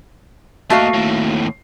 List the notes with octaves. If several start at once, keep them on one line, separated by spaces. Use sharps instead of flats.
A3 A#3 F#4 D#5 F5
D#2 A2